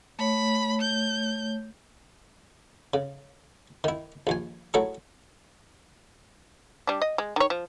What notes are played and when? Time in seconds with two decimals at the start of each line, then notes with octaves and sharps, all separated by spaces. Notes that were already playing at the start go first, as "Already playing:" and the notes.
0.19 A3 C#5 B5
0.81 G6
2.94 C#3
3.84 D#3 E4
4.27 A#1 D#2 G#5
4.74 F#3 A3 E4 G#4
6.87 G3 D4
7.02 D#5
7.18 G#3
7.36 D#3 C#5
7.50 F3